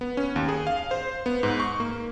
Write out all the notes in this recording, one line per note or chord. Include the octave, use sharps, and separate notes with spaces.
B3
C#4
D#2
G#4
F5
C5
B3
G#2
C#6
A#3